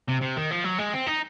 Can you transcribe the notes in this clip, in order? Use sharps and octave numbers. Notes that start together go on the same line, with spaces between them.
C3
C3
D#3
F3
F#3
G#3
C4
D#4